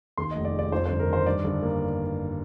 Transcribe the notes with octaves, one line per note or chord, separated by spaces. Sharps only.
D#2 C6
D#5
F1
D5
G#3
D5
F2 C5
C5
G1
A#4
D#3 C5
G2 D5
G1
A#3